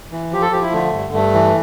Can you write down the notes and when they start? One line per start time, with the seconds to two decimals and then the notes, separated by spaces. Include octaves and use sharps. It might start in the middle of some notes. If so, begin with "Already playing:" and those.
0.11 E3
0.31 F3 G4
0.42 A4
0.52 F3 G4
0.62 E4
0.72 D3 A3
0.93 G2
1.13 G2 A3
1.34 E3